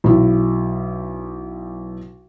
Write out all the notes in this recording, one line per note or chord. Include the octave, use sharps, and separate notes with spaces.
B1 E4